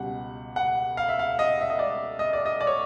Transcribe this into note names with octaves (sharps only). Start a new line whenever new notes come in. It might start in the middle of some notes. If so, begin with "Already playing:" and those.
Already playing: C#2 B2 G3 F#5
F#5
F5
E5
F5
D#5
E5
D#5
D5
D#5
D5
D#5
D5
C#5